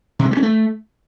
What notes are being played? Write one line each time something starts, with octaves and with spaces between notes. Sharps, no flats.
C3
G#3
G3
C#4
A3